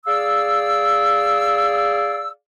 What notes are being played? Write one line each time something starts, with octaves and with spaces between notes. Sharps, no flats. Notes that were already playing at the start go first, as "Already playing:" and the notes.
G#4 D5 F5 E6